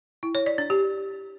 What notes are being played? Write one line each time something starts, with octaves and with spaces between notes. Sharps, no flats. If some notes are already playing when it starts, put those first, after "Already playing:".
E4
C#5
D5
D4
G4